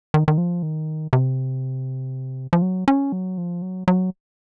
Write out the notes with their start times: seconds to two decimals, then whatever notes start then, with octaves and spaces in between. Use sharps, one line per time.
0.14 D#3
0.28 D#3
0.38 F3
0.63 D#3
1.13 C3
2.53 F3
2.62 F#3
2.88 C#4
3.12 F#3
3.38 F3
3.62 F#3
3.88 F#3